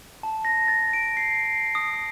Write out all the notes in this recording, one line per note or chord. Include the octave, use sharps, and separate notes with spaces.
A5
A#6
A6
D7
C7
D#6